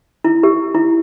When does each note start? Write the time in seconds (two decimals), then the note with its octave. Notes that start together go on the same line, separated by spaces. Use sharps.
0.25 E4
0.43 G4
0.75 E4